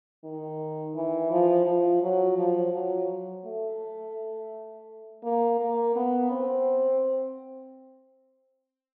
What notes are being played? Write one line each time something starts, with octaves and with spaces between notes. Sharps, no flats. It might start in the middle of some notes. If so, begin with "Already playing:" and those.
D#3
E3
F3
F3
F#3
F3
F#3
A3
A#3
A#3
B3
C4